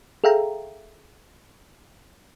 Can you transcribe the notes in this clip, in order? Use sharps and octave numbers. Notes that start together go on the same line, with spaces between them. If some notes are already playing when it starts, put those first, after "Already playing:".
G#4 A4 E5 F5 G5 A#5